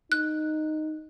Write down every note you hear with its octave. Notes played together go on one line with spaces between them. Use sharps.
D#4 F#6